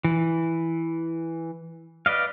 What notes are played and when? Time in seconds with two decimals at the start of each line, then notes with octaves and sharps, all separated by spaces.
0.04 E3
2.06 B4 D5 D#5 F5